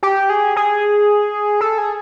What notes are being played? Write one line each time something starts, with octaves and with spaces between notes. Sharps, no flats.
G4
G#4
G#4
A4
G#4